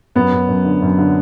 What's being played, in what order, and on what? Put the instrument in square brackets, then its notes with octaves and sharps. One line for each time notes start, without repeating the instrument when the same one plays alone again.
[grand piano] F#2 [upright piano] B3
[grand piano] F#2
F#2
D3
F#2
D3